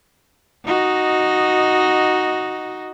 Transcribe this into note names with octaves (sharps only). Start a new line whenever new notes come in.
D#4 F#4 D#5